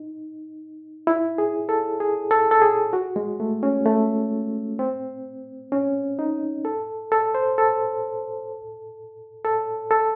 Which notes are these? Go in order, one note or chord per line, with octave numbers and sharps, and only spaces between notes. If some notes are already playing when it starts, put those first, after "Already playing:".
Already playing: D#4
E4
G#4
A4
G#4
A4
A4
G#4
F#4
G#3
A3
C#4
A3
C4
C#4
D#4
A4
A4
C5
A4
A4
A4